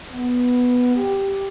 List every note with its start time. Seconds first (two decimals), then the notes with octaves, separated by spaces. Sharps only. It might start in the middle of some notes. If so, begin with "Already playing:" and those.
0.11 B3
0.96 G4